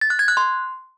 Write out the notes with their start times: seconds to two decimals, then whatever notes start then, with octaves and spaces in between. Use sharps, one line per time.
0.01 A6
0.10 F#6
0.19 G#6
0.28 F#6
0.37 C6